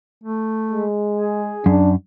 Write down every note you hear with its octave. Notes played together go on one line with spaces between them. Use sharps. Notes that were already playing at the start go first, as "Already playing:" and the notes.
A3
G#3
G#4
F#2 D4